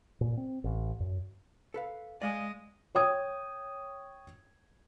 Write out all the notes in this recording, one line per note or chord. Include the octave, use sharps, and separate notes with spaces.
A#2
C4
A1
F#2
A4 B4 F5
G#3 D5 D#5 F5 G#5
C#5 G5 D#6 G#6